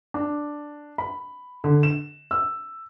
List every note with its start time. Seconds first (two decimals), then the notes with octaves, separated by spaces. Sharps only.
0.14 D4
0.98 B5
1.64 D3
1.83 E7
2.31 E6